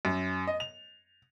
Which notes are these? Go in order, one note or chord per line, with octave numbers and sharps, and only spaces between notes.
F#2
D#5
F7